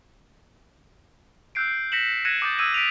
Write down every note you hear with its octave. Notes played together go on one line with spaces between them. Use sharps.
E6 F#6 G6 C7 D7
A#6 B6 C#7 E7 F#7
F#6 G#6 A#6 C#7 D#7 E7
D6 D#6 G6 A6
D#6 E6 G#6 D#7 F#7
B6 D7 D#7 F7